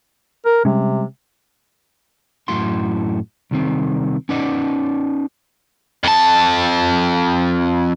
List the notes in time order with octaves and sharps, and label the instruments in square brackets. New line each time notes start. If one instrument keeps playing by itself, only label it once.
[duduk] A#4
[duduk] C3 [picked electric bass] G3 G#3 C#4
[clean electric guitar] F#2 A2 E4 F#4 C6
C2 D#3 C4
C#4 D#4 B4 D5 D#5 F#5
[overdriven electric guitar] F2 A5